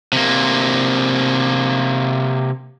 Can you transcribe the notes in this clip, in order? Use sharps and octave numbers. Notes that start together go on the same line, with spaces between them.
C3 A#3